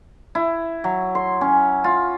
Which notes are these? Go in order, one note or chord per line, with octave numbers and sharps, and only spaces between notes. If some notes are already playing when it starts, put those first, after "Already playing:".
E4
F#3
C6
C#4
F4